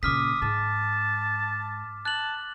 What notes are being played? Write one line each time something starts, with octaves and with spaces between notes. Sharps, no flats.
A#2 C#3 D6 D#6 F6 B6
G#2 A5
A5 F#6 F#7